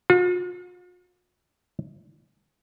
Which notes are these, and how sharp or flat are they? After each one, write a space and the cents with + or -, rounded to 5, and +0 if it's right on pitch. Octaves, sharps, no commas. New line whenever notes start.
F4 +45